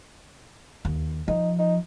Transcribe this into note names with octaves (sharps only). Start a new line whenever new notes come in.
D#2
F3 D#4
D#4